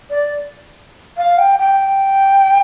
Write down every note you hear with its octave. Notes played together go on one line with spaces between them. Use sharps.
D5
F5
G5
G5